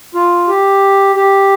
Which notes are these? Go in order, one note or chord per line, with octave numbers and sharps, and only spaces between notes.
F4
G4
G4